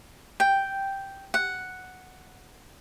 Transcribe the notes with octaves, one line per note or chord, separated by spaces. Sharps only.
G5
F#5